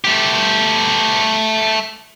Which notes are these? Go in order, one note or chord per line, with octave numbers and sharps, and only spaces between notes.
A3 G4